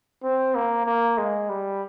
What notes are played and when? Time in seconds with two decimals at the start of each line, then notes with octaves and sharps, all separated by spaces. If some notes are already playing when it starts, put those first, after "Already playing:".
0.23 C4
0.55 A#3
0.86 A#3
1.18 G#3
1.49 G3